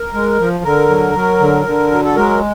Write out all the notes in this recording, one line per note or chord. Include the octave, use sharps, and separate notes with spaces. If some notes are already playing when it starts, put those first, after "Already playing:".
Already playing: A#4
G#3
F3
D3 A#4
F#3
F#3
D3
D3
F#3
A4
G#3 A#4